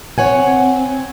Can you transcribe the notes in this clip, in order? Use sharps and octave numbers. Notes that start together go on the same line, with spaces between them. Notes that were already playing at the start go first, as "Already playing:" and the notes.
C4 C#5 F#5 G#5